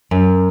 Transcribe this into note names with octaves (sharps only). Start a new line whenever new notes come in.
F#2